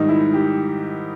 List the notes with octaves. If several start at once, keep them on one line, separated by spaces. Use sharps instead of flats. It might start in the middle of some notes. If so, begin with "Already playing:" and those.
Already playing: G#2 D#3 G3 D#4
E4
G4